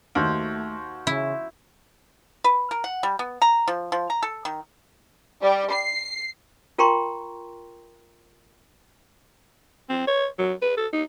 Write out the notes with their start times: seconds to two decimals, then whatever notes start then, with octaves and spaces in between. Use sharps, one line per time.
0.15 D#2 A3 F#4 C5
1.07 C#3 E4
2.44 B4
2.71 A#4
2.84 F#5
3.03 G3
3.19 B3
3.42 A#5
3.68 F3
3.92 F3
4.10 A#5
4.23 A4
4.45 D#3
5.42 G3
5.73 C7
6.78 F4 A#4 G5 A#5 C6 C#6
9.90 C4
10.07 C#5
10.39 F#3
10.62 B4
10.77 A4
10.93 D#4